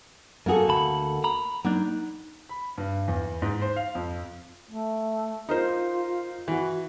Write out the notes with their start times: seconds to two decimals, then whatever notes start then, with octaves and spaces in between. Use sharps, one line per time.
0.46 F#2 A#3 F#4 G#4 A4
0.68 D2 A5 B5
1.24 A#5 B5
1.65 F#3 A#3 D4 D#4
2.49 B5
2.78 G2
3.08 E2
3.42 G#2
3.62 C5
3.76 F5
3.95 F2
4.71 A3
5.49 D#4 F4 A#4 C5
6.48 E3 F#4